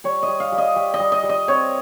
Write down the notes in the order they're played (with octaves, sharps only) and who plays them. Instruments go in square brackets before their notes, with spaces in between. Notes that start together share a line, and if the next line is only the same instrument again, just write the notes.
[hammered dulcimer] G3 C#5
D#5
G3
F5
G3
D#5
G3
D#5
G3
D#5
G3
D#5
C4 C#5